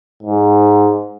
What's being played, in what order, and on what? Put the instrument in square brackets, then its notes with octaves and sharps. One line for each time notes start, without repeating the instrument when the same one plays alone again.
[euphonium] G#2